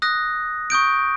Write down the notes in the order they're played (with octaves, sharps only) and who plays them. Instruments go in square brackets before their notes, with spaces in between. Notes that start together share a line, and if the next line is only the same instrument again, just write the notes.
[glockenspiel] D#6 F#6 A#6
C#6 D#6 G6 D7